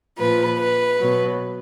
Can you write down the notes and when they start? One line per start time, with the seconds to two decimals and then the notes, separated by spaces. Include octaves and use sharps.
0.17 A#2 F3 B4
0.58 B4
0.99 B2 F#3